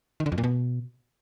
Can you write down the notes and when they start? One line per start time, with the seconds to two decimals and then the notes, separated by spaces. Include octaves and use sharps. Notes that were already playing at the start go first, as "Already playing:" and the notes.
0.20 D#3
0.26 D3
0.32 F2
0.38 A#2
0.44 B2